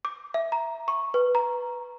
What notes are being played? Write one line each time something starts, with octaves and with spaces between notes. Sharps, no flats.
D6
E5
A#5
C#6
B4
A#5